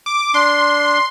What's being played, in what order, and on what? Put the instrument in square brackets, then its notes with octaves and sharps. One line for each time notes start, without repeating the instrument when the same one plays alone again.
[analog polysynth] D6
[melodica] D4 [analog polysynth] C6